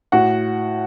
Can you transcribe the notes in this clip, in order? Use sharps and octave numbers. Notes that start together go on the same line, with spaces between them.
A2 F#4 F#5